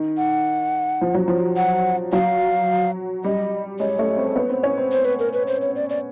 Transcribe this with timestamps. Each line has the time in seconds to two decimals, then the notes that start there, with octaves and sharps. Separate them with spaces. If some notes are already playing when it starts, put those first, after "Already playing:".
Already playing: D#3
0.17 F#5
1.01 F3
1.14 F#3
1.28 F3
1.57 F#5
2.13 F#3 F5
3.24 G3 D#5
3.79 G#3 C#5
3.99 A3
4.17 C4
4.36 B3
4.50 C4
4.63 C#4
4.78 C4
4.92 C5
5.05 B4
5.19 A#4
5.33 B4
5.47 C5
5.62 C#5
5.76 D5
5.90 D5